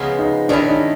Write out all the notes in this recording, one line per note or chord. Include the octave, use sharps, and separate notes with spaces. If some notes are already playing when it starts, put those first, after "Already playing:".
Already playing: C#3 F3 G#3 B3
D#4
D#3 G#3 C#4 D4 E4
D#4